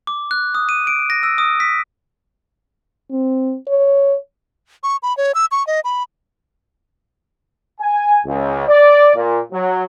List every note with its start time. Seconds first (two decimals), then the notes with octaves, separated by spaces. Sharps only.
0.07 D6
0.31 F#6
0.55 D#6
0.69 D#7
0.87 D7
1.10 A#6
1.23 E6
1.38 D#6
1.60 B6
3.10 C4
3.67 C#5
4.83 C#6
5.03 B5
5.17 C#5
5.35 E6
5.52 C#6
5.67 D#5
5.84 B5
7.80 G#5
8.25 C#2
8.69 D5
9.16 A#2
9.53 F#3